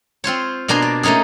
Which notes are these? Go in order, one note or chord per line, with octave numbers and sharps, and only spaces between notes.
C4 F4 C5 C#5
B2 A#3 D4 G#5 A#5 C6
D5
A3 A#3 C#4 D#4 G#4